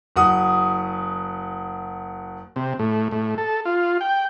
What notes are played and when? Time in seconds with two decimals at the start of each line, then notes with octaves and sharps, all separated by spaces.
0.16 F#1 F#4 D#6
2.56 C3
2.79 A2
3.11 A2
3.38 A4
3.65 F4
4.01 G5